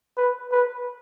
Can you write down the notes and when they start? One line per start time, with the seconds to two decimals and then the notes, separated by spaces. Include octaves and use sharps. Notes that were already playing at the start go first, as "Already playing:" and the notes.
0.17 B4
0.52 B4